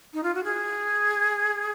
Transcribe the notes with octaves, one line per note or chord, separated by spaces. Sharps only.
D#4
F4
F#4
G#4